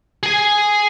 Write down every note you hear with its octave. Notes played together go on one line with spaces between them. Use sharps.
G#4 G#5